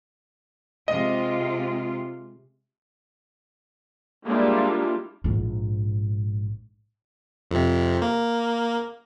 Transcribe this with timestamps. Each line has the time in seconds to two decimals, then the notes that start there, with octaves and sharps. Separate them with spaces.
0.88 C3 G#3 F4 D#5
4.28 G3 G#3 A#3 D4 E4 F4
5.24 A#1 G#2
7.51 F2 C3
8.02 A#3